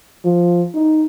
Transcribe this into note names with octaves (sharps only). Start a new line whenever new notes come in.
F3
D#4